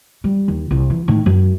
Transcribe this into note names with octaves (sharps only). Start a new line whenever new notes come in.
G3
D#2
C2
E3
A2 D#3
F#2